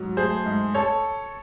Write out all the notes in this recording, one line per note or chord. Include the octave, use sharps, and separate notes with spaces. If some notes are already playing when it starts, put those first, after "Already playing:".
Already playing: G#2 F#3
A3 G#4 C5
G#2
A4 C#5